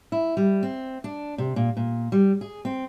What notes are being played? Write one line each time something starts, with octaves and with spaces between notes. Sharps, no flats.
E4
G3
C4
D4
C3
A#2
A#2
G3
G#4
C4